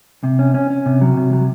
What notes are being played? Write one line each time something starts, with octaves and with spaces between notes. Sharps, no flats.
C3
C#4
C#4
C#4
C3
F#3
C3
F#3